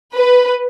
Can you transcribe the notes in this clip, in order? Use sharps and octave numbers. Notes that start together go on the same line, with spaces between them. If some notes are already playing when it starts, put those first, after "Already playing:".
B4